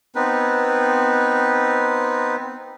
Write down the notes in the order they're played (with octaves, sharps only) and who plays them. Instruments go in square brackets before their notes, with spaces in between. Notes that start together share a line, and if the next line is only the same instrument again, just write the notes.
[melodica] B3 C4 D#4 B4